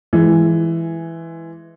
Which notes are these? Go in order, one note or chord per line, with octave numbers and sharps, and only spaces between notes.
E3 G#3